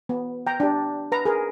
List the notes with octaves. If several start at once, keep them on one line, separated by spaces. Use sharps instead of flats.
B3
G5 A#5
D4 G4
B4 A#5
G#4 A#4